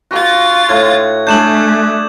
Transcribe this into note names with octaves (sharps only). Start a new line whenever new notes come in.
F4 F#4 A6
A2 G#6
A3 D4 G#4 G6 E7 F#7